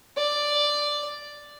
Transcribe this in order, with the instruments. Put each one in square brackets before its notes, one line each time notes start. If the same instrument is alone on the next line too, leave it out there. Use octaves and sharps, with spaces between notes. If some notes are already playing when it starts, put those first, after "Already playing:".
[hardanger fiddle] D5